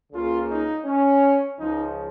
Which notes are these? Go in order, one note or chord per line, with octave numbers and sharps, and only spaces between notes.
C#2 C#3 A#3 F4
D#4
C#4
C#2 C#3 F3 D#4